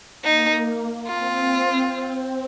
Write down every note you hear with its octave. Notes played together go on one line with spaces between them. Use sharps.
A#3 D#4
C4 F4